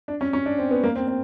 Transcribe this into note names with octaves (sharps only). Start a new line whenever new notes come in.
D4
C#4
C#4
D4
C4
B3
A#3
C4
C4